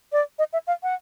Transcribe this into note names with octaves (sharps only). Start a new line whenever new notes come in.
D5
D#5
E5
F5
F#5